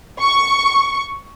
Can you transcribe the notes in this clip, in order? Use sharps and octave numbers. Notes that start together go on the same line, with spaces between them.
C#6